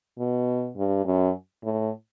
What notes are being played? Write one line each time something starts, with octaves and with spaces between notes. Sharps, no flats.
B2
G2
F#2
A2